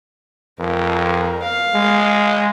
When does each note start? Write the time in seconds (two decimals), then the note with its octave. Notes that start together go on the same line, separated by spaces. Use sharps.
0.59 F2 A#4
1.42 F5
1.74 G#3